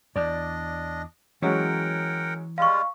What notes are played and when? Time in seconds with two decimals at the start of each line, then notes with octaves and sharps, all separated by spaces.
0.16 E2 D4 D5 D#5
1.42 E3 F#3 G#3 C#4 A#4 F#5 G5
2.58 G3 G#3 F4 F5 C#6